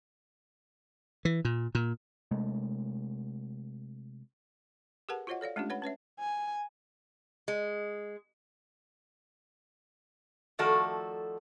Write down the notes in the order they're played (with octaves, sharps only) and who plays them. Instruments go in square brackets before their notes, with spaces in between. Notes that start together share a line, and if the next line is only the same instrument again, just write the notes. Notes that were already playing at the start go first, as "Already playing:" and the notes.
[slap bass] E3
A#2
A#2
[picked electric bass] C3 G#3 A3
[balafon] G4 G#4 A#4 B4 F#5 A5
F4 F#4 C5 C#5 D#5 F#5
A4 C#5 D5 F5
G#3 A3 C#4 D4 F4 G4
B4 C#5 F#5 B5
C#4 B4 C#5 E5
[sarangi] G#5
[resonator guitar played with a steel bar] G#3
D#3 F3 A3 F#4 A4 D5